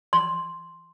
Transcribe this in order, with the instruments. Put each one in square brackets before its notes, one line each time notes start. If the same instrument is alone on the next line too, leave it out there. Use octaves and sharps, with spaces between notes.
[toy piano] C6